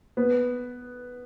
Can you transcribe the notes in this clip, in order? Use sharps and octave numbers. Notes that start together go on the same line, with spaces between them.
B3